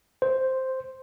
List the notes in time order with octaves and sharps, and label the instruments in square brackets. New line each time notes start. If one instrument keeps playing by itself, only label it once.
[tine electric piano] C5